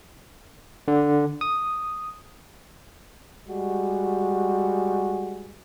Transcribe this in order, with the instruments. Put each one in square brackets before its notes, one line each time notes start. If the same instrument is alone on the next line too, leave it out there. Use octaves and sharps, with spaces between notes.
[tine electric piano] D3
D#6
[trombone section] G3 G#3 F#4